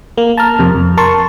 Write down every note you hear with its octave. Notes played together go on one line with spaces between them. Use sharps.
A#3
A5 A#5 F6
F2 C3
F2
A#4 A5 C6 C#6